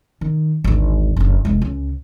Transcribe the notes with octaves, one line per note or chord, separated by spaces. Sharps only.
D#3
G#1 D2
F#1 D3
F1 G#3
C#2